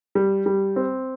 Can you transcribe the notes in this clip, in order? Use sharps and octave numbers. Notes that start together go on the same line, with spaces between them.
G3
G3
C4